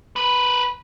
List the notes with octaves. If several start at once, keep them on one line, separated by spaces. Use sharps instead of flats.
A#4 B4